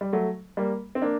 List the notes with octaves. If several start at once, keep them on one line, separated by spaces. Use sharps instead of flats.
G3
F#3 A3
G3 A#3
C4
A#3 D4